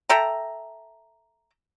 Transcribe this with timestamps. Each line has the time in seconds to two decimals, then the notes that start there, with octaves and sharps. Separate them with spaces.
0.09 A4 E5 G5 A#5